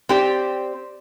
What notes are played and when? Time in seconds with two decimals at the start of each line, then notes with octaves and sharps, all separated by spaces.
0.09 C4 G4 D5